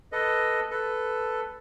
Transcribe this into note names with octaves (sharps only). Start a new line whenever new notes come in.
A4 B4 D#5
A4 B4